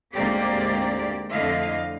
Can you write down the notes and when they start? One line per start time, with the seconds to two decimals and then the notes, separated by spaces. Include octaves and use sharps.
0.13 D2 G#2 A#3 C4 G4 D5
1.30 F2 D3 A3 E4 D#5 F5